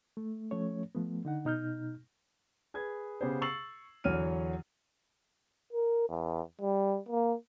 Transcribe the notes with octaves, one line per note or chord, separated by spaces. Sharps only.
A3
F3 A3 C#4 C#5
F3 A3 B3
D3 D#4 F#5
B2 D#4 F6 G6
G#4 B4 G#6
C#3 B3 G4 G#4 C5
C#6 E6 A6 C7 F#7
E2 D3 F#3 C#5 F6 D#7
A#4
E2
G3
A#3